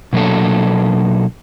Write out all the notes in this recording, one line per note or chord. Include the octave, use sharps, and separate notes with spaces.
B2 F#3 A#3 D4 A4